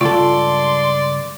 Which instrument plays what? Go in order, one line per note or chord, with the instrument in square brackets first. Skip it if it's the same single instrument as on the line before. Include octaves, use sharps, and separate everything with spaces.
[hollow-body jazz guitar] C#2 G2 A4 [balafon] F4 [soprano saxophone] D5 [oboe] C6